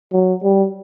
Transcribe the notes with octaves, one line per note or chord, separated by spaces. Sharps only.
F#3
G3